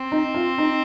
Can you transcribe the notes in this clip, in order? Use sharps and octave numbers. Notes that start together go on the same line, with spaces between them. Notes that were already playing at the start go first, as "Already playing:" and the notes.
Already playing: C4
D#4
F4
D#4